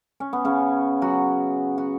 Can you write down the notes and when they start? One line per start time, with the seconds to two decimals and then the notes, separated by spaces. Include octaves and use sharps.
0.20 C#4
0.33 B3
0.45 C#3 C#4
1.02 F#3 F#4
1.78 F#4